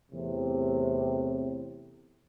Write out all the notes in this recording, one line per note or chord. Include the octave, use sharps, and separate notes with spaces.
E2 A2 C3